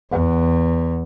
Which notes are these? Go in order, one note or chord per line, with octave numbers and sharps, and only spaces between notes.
E2